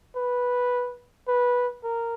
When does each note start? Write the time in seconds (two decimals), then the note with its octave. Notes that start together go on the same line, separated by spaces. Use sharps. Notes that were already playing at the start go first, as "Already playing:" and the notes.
0.16 B4
1.28 B4
1.84 A#4